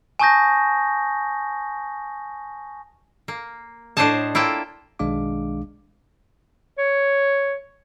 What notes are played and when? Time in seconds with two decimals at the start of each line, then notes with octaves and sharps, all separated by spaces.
0.19 G#5 A5 C#6 D#6 G6 A#6
3.28 A#3
3.97 A2 D4 C5 C#5 D#5 A5
4.35 A#3 E4 F4 G5 A5
4.99 B1 D#3 G#3 D4 F5 D6
6.78 C#5